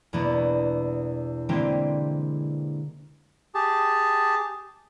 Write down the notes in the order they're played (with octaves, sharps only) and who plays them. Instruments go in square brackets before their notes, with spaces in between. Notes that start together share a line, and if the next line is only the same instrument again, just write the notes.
[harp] E2 B2 A#3 B3 D4
D3 E3 G#3 A#3 C4 G4
[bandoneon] G4 G#4 A5